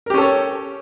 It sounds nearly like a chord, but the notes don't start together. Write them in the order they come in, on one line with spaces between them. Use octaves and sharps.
A#4 G4 C#4 A4 C#5